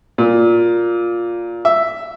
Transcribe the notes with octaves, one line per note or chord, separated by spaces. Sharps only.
A#2
E5